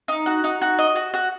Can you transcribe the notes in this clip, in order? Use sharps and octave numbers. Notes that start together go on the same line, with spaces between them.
D#4
F#4
D#4
F#4
D#5
F#4
F#4